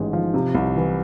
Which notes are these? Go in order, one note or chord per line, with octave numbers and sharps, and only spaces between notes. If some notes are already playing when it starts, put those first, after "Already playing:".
Already playing: A1 G#2
F3
C3
C2
E3